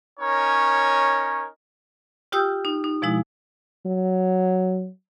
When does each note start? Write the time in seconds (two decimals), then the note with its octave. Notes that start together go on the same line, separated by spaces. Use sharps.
0.20 C#4 D#4 A#4 C#5
2.32 F4 G4 G5 D#6 E6 G6
2.65 D#4
2.84 D#4
3.02 B2 F3 G#3 E4
3.86 F#3